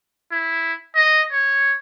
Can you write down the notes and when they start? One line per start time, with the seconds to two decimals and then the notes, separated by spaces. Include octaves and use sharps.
0.32 E4
0.96 D#5
1.32 C#5